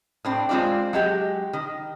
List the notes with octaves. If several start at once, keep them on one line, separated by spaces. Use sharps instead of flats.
A2 C4 D4
G#3 C4 F4 C5 D5
F#3 G#3 G4
D#3